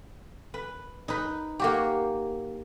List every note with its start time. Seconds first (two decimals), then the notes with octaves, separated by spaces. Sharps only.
0.54 B4
1.08 D#4 B4
1.60 A#3 F#4 G4